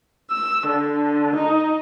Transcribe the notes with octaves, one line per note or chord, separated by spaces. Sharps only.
E6
D3
D#4